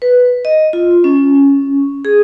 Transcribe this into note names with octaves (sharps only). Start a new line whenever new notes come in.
B4
D#5
F4
C#4
G#4